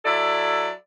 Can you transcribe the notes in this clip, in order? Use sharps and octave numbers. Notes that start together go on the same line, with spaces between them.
F#3 E4 A4 D5